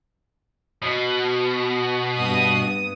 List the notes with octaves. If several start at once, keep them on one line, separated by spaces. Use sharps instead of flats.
B2
G2 B3 D#6